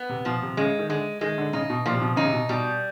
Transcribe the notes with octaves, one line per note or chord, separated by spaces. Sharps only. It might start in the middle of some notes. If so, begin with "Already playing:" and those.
Already playing: B3
C3
B2 F3
C3
C#3 G#3
D#3
D3 G#3
D#3 G#3
D3
C#3 D#4
B2
A#2 F3
C3
B2
C#3 D#4
C3
B2
B2 G3